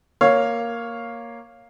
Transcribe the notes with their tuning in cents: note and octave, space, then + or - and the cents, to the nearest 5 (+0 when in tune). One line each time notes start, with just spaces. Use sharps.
A#3 +0 C#5 +0 F5 +0